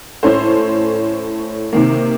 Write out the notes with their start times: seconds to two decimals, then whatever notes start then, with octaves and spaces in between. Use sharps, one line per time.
0.23 A2 A3 C#4 A4 C5
1.73 C3 D#3 A#3